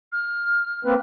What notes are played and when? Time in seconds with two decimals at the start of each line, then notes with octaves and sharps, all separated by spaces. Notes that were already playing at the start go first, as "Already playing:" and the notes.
0.12 F6
0.85 A#3 C4 B4